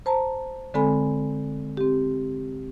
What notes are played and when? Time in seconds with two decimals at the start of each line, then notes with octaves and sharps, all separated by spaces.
0.06 C5 A5 A#5
0.74 D3 G#3 C4 A4 G#5 B5
1.77 C4 G4